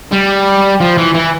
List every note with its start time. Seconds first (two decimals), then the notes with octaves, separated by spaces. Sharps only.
0.13 G3
0.81 F3
0.98 E3
1.14 E3